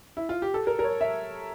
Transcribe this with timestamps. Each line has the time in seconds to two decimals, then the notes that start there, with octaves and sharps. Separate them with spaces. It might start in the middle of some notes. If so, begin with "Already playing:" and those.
0.17 E4
0.29 F4
0.42 G4
0.54 A4
0.67 A#4
0.79 A#4
0.84 C#5
1.01 E5